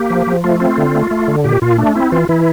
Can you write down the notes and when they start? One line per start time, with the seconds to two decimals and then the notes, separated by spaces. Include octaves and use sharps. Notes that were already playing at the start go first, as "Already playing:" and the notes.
Already playing: A#3 G4
0.10 F3
0.27 F3
0.44 A3 F4
0.60 C4 F4
0.78 D3
0.95 A3
1.11 A3
1.28 D3
1.44 A#2 G4
1.62 A#2 F4
1.78 A3 D4
1.95 C4 E4
2.12 E3 F4
2.29 E3 E4